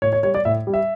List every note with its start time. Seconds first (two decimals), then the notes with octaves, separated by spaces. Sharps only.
0.02 A2 C#5
0.13 C#5
0.23 G3 C#5
0.35 D5
0.45 A2 E5
0.67 G3
0.74 E5